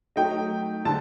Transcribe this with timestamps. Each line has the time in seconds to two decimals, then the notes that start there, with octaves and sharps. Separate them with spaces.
0.16 F#3 A3 D#4 G5
0.85 D3 A5